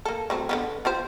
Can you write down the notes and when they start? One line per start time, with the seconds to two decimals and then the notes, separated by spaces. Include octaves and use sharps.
0.05 A#3 A4
0.30 F#3 A3 C4
0.49 D3 F#3 B3
0.85 F4 G4 C5